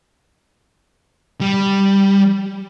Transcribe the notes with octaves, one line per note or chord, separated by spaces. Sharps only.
G3